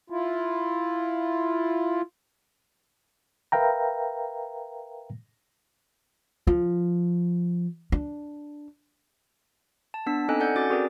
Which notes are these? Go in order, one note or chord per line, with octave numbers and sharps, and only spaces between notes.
E4 F4
A#4 B4 E5 F5 G5 A#5
F3
D4
A5
B3 D4 E6 B6
C4 D#4 A4 D#5 G#5 F#6
A4 D5 F#5 G#5 G6
C#4 F#4 D6 A6
C4 F#4 G#4 A#4 D5